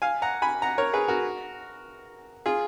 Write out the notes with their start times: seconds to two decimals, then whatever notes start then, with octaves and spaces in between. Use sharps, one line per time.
0.02 F5 G#5
0.22 F#5 A#5
0.42 G#5 B5
0.62 F#5 A#5
0.78 A#4 C#5
0.94 G#4 B4
1.08 F#4 A#4
2.46 F4 G#4